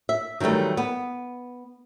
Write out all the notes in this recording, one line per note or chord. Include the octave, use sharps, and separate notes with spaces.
E5
D#3 E3 F#3 G3 A3
B3